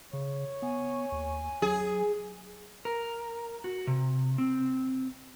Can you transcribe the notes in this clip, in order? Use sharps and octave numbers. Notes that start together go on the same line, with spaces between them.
C#3 C#5
B3 G#5
D#2
F#3 G#4
A#4
F#4
C3
C4